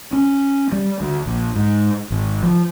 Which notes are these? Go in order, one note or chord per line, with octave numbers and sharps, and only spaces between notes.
C#4
G3
D2
A#1
G#2
G#1
F3